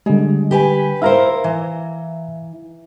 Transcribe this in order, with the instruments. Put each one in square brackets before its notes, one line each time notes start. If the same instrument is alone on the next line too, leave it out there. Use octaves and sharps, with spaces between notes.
[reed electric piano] D3 G3 [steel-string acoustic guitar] G#3
[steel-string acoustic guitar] G4 B4 G#5
[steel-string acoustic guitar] E4 A#4 C5 [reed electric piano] E5 F5 A#5
[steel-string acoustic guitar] E3